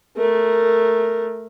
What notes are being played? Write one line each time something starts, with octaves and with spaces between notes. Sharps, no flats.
A3 A#4